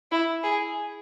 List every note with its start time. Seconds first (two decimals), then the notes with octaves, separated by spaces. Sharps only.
0.12 E4
0.43 G#4